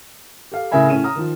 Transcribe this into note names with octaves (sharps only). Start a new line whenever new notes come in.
G4 A4 F5
A2 C#3 A#4 E5 G#5 B5
A2 C#4 D#7 E7
A#5 D#6 F6
D#3 F3